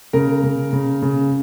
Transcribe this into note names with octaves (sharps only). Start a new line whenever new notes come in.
C#3 A#4
C#3
C#3
C#3